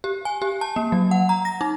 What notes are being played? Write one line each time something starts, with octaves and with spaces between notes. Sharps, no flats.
G4
G#5
G4
A5
A#3
F#3
F#5
A#5
A#6
D#4